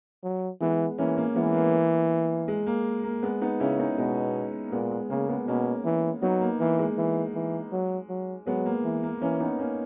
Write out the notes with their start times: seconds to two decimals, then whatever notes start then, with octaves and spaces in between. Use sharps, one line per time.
0.24 F#3
0.61 E3 G#3 B3
0.98 E3 A#3 C#4
1.17 A#3 C#4
1.35 E3 G#3 B3
1.54 A#3
2.48 G#3
2.67 A#3
3.04 A#3
3.23 G#3 B3
3.41 B3 D#4
3.60 C#3 C#4 E4
3.79 B3 D#4
3.98 B2 G#3 B3
4.67 A#3
4.72 A#2 G#3 B3
4.91 G#3
5.10 C#3 A#3
5.29 G#3 B3
5.47 B2 A#3 C#4
5.85 E3
6.22 F#3 B3 D#4
6.41 A#3
6.60 E3 A#3
6.79 G#3
6.97 E3
7.35 E3
7.72 F#3
8.09 F#3
8.47 F#3 G#3 B3
8.66 A#3
8.84 E3
9.03 A#3
9.21 E3 A#3 C#4
9.40 B3 D#4
9.59 A#3 C#4